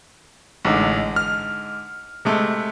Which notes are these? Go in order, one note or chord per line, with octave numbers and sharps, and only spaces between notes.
A1 G#2 D3 D#4
F6
C3 G#3 A3